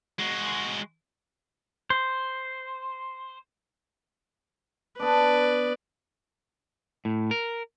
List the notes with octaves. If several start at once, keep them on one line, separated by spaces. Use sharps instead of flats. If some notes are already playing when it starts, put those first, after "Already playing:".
G#3 F#4
C5
B3 D4 B4 D5
A2
A#4